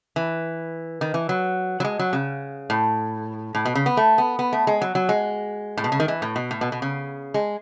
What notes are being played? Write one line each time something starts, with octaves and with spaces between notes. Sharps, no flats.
E3
D#3
E3
F#3
F#3
G#3
F#3
C#3
A2
A2
B2
C#3
B3
A3
B3
B3
A3
G#3
F#3
F#3
G#3
A2
B2
C#3
D#3
E3
A2
B2
A2
B2
B2
C#3
G#3